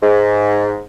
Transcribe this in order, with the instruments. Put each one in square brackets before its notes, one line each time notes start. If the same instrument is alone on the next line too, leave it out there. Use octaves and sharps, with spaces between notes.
[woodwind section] G#2